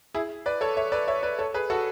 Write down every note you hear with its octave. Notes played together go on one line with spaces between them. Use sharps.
E4 G#4
B4 D5
A4 C#5
C#5 E5
B4 D5
C#5 E5
B4 D5
A4 C#5
G#4 B4
F#4 A4